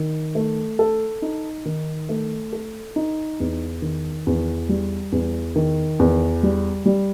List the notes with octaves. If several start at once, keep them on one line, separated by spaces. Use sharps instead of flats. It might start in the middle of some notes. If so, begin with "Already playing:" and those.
Already playing: D#3
A3
A4
D#4
D#3
A3
A4
D#4
E2
D#3
E2
G3
E2
D#3
E2
G3
G3